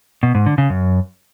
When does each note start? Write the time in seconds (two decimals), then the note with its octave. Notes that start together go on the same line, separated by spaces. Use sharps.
0.23 B2
0.35 G#2
0.46 D3
0.58 C#3
0.70 F#2